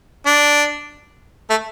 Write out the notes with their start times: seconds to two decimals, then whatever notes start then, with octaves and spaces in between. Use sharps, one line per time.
0.26 D4
1.50 A3